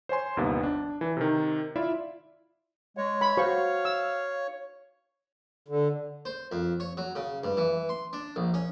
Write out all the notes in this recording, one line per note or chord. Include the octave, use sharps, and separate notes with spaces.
C5 C#5 G#5 C6
G1 D#2 C3 B3
D4
E3
C3 D#3
E4 F4 D5 E5 B5
G#3 C#5
B5
F#4 C5 F5 C#6
E6
D3
C5
F2
C#5
F#3
C#3
G2
E3
C6
D4
A#1
C#4